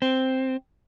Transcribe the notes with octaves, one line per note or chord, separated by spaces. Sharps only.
C4